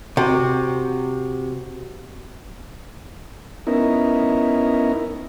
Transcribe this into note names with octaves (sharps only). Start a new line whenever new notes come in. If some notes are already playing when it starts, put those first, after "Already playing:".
C3 F#4
B3 C#4 D#4 E4 A#4